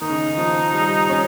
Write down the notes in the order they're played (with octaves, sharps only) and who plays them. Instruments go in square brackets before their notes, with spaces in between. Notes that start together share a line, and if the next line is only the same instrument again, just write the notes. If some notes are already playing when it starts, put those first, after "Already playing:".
[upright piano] D#3 [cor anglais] D#4
[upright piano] C#3
D#3
F3
G3
C#4